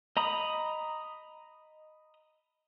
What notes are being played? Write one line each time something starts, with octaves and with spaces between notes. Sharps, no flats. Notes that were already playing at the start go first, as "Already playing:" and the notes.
D#5 A#5 B5 D#6